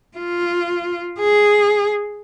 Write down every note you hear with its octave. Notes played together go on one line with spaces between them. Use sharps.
F4
G#4